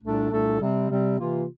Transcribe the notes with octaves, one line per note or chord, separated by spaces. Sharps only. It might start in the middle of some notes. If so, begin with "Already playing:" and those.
C2 A#2 A3 D4 A4
C2 A#2 A3 D4 A4
C3 G3 C4
C3 G3 C4
C3 E3 A#3 F4